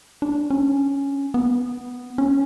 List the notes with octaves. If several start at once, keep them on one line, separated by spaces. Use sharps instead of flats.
D4
C#4
B3
C#4